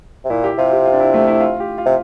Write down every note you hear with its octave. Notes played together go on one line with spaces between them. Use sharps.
C3
A#2 E4
G4
C3 F4
G4
F4
D4
E4
A3
E4
F4
G4
F4
C3